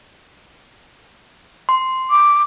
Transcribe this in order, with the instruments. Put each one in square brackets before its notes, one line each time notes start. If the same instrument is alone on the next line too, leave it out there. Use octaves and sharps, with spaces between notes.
[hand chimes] C6
[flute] D6